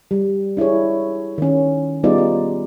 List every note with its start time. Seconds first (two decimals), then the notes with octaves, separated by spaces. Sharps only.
0.11 G3
0.57 D4 E4 G#4 C#5
1.38 D#3 C#4
2.04 G3 B3 D#4 F4 G#4 D5
2.18 D5